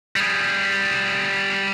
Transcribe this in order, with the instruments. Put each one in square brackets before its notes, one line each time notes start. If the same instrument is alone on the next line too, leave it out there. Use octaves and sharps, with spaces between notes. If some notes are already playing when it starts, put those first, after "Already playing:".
[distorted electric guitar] G3 G#4